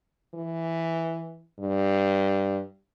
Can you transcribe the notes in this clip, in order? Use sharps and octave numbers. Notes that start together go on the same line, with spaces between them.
E3
G2